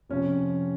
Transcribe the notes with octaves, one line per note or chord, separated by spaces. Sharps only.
F2 C3 F3 C#4